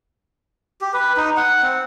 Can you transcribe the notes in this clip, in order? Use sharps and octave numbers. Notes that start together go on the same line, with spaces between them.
G4
B4
D#4
F#5
C4